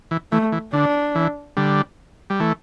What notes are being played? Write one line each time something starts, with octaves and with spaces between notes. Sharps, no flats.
E3
E3 A3
E3
D3 D4
E3
D3 G3
G3
E3 A3